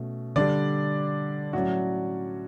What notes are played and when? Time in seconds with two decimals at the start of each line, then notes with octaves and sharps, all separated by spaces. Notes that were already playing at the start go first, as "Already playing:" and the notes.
Already playing: B2 A3 C#4
0.36 D3 G3 D4 D5
1.53 A2 F#3 C#4 F#4